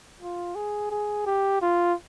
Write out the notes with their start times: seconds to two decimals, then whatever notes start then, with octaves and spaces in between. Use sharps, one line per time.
0.20 F4
0.55 G#4
0.91 G#4
1.26 G4
1.62 F4